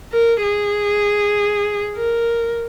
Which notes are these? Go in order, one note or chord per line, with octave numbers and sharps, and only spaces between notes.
A#4
G#4
A#4